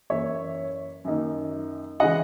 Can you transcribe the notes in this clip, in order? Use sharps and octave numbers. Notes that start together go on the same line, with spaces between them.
F#2 E3 A#3 E4 C#5 E5
F#2 D#3 A#3 D#4
C#3 E3 G#3 D#5 F#5